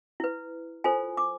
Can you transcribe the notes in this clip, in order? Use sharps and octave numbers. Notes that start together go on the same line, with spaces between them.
E4 B4
F4 A4 C5 G#5
D6